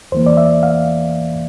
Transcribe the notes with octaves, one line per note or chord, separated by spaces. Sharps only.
E2 E3 A#3 C5
D5
E5
F5